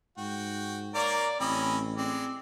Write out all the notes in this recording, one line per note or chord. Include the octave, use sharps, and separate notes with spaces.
G#2 F#4 G5
A#3 A#4 C#5 D5
A1 C4 C#4 D#5 B5
G#3 C4 D5